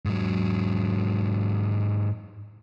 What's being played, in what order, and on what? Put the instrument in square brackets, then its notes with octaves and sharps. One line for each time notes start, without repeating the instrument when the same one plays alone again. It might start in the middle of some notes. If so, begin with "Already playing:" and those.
[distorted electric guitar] G#2 F#3